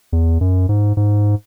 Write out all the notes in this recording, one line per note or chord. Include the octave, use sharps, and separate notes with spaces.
E2
F#2
G#2
G#2